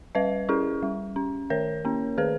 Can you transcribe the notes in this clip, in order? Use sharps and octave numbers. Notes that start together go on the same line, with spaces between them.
G3 B4 D#5
C#4 E4 G#4
G3
C#4
D#3 A#4 C#5
A#3 C#4
D#3 G#4 B4